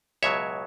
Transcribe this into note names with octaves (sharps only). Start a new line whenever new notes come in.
C#2 B2 F#3 C#5 E5